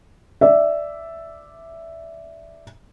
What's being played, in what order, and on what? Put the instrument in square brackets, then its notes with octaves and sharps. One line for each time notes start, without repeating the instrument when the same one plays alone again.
[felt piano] D5 E5